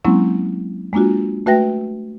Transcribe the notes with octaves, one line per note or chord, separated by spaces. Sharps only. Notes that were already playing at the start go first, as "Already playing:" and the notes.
F#3 G#3 A#3 C4 C#4 E4
G#3 A#3 D4 F4 F#4
A3 F#4 B4 E5 G5 A#6